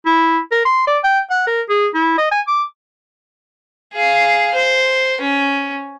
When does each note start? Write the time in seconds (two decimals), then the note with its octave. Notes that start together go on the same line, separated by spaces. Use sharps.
0.06 E4
0.51 A#4
0.65 C6
0.87 D5
1.04 G5
1.30 F#5
1.47 A#4
1.69 G#4
1.94 E4
2.18 D#5
2.32 G#5
2.47 D6
3.93 G#4 F5
4.55 C5
5.21 C#4